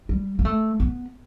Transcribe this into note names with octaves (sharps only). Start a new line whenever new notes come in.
G3
A#3
A3
B3